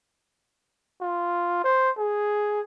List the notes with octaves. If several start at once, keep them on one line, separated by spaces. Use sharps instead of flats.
F4
C5
G#4